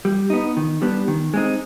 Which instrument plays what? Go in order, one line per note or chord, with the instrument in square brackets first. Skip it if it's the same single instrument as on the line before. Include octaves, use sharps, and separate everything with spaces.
[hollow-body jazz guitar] G3
B3 D#4
D#3
G3 B3 D4
D#3
G#3 C4 D#4